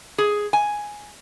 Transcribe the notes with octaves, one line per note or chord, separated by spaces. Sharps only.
G#4
G#5